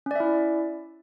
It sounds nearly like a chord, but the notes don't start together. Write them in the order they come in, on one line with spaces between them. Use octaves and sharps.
C#4 D5 E5 E4